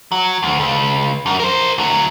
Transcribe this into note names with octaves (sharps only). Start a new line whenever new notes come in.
F#3
D2
C#2
F#2
A#4 C5
D2 F#3